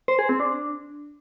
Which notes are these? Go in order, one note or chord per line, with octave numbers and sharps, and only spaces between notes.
C5
G#4
C4
D4